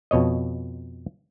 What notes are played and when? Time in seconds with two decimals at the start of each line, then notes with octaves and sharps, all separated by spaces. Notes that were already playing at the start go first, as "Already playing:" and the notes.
0.11 F2 B2 C#5 D#5